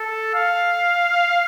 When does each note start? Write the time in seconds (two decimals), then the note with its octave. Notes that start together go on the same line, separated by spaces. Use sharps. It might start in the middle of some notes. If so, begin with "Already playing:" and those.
Already playing: A4
0.35 F5